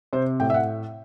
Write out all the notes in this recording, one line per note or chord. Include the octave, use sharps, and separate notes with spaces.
C3 C5
A2 G5
E5
F#5